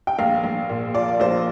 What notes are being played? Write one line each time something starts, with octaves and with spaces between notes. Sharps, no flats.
G5
A#1 F5
A#1
A#2
F3 D5
A#1 C5